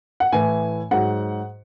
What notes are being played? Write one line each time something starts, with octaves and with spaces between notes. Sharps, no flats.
F#5
A2 E3 G#5
G#2 F#3 F#5